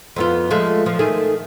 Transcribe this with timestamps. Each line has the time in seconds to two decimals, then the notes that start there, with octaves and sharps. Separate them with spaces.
0.16 F2 B3 F4
0.51 F3 G#3 A3
0.86 F3
0.99 D#3 A3 G#4